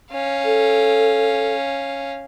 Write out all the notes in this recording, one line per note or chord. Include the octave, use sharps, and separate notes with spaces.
C#4 F5
A4